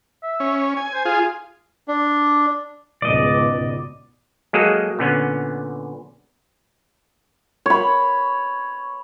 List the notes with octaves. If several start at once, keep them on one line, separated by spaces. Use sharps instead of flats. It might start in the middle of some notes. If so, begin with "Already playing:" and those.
E5
C#4
G#5
C5
F4 G#4 G#5
D4
C#2 G#2 B2 D5 D#5
F#3 G#3 A#3 G#4 A4
A#2 D3 B3 C#4
C#5 B5